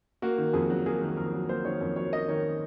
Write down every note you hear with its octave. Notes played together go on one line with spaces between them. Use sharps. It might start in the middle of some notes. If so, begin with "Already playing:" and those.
A#3 F#4
D#3
F2 G#4
F#3
A#3 G#4
D#3
F2 A#4
F#3
A#3 C5
D#3 C#5
F2 C#5
F#3 C#5
A#3 D#5
D#3 C#5